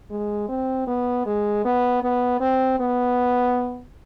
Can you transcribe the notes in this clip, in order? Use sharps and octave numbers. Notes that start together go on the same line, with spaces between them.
G#3
C4
B3
G#3
B3
B3
C4
B3